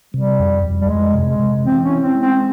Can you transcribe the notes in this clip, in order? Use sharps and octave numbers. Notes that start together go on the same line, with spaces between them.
C3 G3
F2
F2
G3
F2 G#3
C3
G#3
C3
E3 C4
C#4
E4
C4
G#3
C4